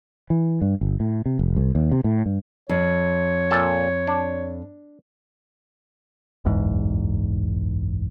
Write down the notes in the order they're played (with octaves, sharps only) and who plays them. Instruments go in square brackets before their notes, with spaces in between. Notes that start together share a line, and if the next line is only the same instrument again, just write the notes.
[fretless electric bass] E3
G2
G1
A2
C3
F1
C2
D#2
C3
A2
G2
[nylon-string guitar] F2 [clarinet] C#5
[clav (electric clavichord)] A#2 A4 A5
D4
[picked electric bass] F#1 B1 E2 G#2